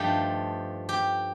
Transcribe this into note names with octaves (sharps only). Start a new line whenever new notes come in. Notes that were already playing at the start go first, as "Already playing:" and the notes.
Already playing: G2 F3 A3 D#4 G4
G4